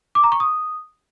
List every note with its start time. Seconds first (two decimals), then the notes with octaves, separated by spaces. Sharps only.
0.15 D6
0.24 A#5
0.32 C#6
0.40 D#6